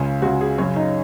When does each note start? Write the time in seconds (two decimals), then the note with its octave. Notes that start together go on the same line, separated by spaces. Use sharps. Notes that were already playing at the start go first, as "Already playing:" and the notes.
Already playing: C#2 C#3
0.22 C#2 C#3 F#4
0.41 G#4
0.58 F#2 C#3 C#4 C#5
0.76 D#4 D#5